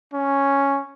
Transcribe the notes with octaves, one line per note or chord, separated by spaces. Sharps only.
C#4